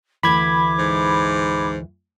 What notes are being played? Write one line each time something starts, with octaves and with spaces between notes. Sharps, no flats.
D2 E3 B5 D6 G#6
G#2